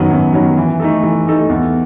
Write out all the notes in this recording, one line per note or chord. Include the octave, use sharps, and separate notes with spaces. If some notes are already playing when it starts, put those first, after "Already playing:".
Already playing: F#2 D#3 F#3 B3
F#2
D#3 F#3 B3
E3
A3 D#4 A4
E3
A3 D#4 A4
E2